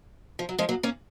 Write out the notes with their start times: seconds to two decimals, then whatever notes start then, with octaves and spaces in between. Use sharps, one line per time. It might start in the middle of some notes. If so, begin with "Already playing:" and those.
0.39 F3
0.49 F#3
0.58 F3 G#3
0.69 F#3 A#3
0.83 A#3 C#4